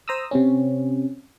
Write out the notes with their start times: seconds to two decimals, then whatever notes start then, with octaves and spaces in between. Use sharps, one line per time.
0.08 C5 A#5 D#6 E6
0.31 C3 C4 C#4